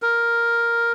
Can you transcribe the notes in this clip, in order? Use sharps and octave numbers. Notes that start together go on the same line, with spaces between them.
A#4